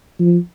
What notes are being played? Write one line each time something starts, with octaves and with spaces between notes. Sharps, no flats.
F3